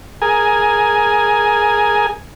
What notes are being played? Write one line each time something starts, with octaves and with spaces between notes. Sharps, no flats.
G#4 A#4 G#5